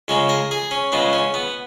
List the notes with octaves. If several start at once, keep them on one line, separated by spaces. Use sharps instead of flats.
C#2 C#3 G#3 C#4
A#4
G#4
C#4
C#2 C#3 G#3 B3
C#4
B3